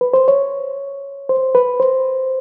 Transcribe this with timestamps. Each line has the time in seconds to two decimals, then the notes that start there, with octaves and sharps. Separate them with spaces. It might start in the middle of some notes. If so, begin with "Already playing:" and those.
0.01 B4
0.14 C5
0.28 C#5
1.29 C5
1.55 B4
1.80 C5